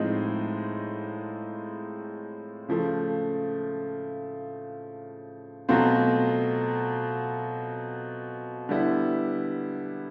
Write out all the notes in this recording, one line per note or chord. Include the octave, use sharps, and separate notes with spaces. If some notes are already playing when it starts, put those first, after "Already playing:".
Already playing: A2 F3 G#3 C4 D#4
C#3 F3 A3
B2 F#3 A3 C4 F4
D3 G3 B3 E4